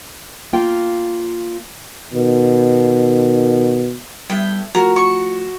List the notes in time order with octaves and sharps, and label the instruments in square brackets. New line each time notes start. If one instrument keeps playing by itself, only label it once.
[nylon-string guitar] A#3 F4 G5
[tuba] B2 [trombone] D#3
[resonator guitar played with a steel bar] A2 B3 E4 [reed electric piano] G3 [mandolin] G5
[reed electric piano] F3 A3 F4 [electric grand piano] F#4 [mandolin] A#4 [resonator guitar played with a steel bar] A#5
[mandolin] C#6